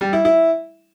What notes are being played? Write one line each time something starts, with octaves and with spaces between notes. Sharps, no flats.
G3
E4
E4